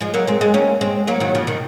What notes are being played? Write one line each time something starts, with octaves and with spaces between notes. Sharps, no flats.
F3 G#3
F#3 A#3
G#3 C4
G#3 C4
A#3 C#4
G#3 C4
F#3 A#3
D#3 F#3
C#3 F3
C3 D#3